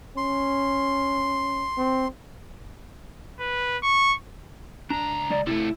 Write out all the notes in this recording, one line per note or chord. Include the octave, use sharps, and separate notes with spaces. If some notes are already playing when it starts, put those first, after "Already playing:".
C#4 C6
C4
B4
C#6
C#2 D4 A#5
G#3 D5
C3 A3 E4